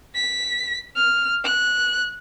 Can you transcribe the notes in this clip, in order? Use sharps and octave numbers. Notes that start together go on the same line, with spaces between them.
B6
F6
F#6